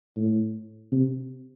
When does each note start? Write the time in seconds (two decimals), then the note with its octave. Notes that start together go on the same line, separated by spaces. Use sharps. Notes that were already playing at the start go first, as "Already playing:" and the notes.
0.17 A2
0.92 C3